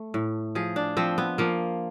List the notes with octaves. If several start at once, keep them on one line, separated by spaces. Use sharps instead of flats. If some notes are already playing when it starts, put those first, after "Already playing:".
Already playing: A3
A2
F3 G#4
D4
F3 C4
B3
F3 A#3